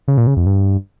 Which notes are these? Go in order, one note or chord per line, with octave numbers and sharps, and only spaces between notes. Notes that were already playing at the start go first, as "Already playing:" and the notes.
C#3
A#2
C#3
F2
G2